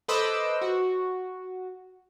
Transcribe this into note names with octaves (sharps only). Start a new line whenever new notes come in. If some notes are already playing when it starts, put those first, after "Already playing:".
A4 B4 C5 D#5 D6 E6
F#4